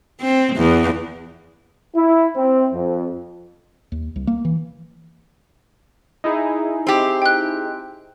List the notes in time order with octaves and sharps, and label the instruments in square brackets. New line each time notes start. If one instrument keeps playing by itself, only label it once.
[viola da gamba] C4
E2
[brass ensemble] E4
C4
F2
[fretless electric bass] D#2
C2
A#3
E3
[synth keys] D#4 E4 G#4
[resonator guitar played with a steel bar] C4 G4
[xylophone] G5 F#6